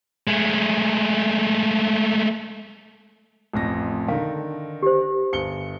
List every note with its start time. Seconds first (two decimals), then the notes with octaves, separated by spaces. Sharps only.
0.27 G#3 A3
3.54 A1 F2 A#6
4.08 D3 D#3 F5
4.82 G4 C5
5.33 G1 C#7 G7